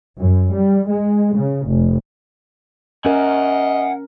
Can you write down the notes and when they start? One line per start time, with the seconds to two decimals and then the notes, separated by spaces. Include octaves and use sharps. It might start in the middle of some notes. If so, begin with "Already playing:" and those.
0.19 F#2
0.55 G3
0.90 G#3
1.37 C#3
1.67 F1
3.05 C#4 A#4 D#5 F#5 G#5